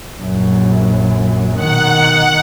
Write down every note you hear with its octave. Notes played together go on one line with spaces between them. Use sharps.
A#1 F#2
B2 D#3 F#5